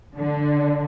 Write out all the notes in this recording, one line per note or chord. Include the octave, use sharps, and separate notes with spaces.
D3